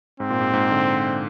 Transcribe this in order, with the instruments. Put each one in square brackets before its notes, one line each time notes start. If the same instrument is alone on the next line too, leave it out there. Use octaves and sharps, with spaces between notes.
[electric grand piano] G#2 [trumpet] C4
[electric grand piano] A#2
G#2
G#2
D3